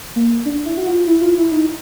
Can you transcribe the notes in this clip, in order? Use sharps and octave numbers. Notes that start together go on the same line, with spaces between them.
A#3
D4
E4
F#4
F4
E4
F4
E4
D#4